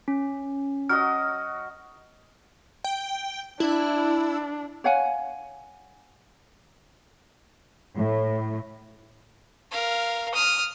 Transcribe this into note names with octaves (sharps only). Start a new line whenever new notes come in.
C#4
F#3 F#4 D#5 F6
G5
D4 E4
C#5 F5 F#5 G#5
A2
A#4 F5
D#6 F6